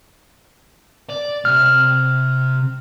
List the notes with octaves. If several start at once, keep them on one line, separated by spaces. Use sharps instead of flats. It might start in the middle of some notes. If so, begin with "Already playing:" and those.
D5
C3 F6